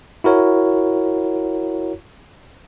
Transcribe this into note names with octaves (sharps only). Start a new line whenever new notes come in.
E4 F#4 A#4 C#5